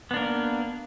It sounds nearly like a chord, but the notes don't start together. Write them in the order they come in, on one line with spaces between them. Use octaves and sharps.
B3 D4 A#3